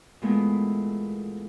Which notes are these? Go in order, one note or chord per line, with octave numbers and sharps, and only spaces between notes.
A#2 E3 G#3 A3 B3